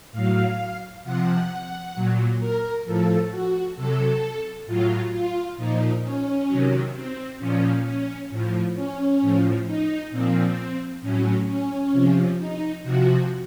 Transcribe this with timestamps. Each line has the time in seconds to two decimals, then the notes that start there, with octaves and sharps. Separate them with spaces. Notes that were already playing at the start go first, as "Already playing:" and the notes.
0.12 A2 F#3 F5
1.04 C3 F3 F#5
1.95 A#2 F#3
2.40 A#4
2.85 A2 F3 A4
3.31 F#4
3.75 C3 F#3 A4
4.66 A2 F#3 F4
5.12 F4
5.57 A#2 F3 D#4
6.03 C#4
6.48 C3 D#3 F#3
6.94 C4
7.39 A#2 F3 C#4
7.84 C#4
8.30 A2 F3
8.75 C#4
9.21 A2 F3
9.66 D#4
10.11 A#2 F3 C4
11.01 A2 F#3 C#4
11.47 C#4
11.92 C3 F3
12.39 D#4
12.83 C3 F3 F#4